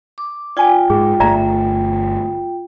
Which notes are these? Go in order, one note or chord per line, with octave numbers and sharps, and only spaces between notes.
D6
F4 D5 G5 G#5
G#2 G#4
G1 A3 D5 E5 A#5